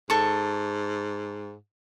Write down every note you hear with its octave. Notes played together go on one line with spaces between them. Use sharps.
G#2 A4 C#6